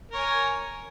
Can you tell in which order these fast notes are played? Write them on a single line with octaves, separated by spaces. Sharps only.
A#4 C#5 G#5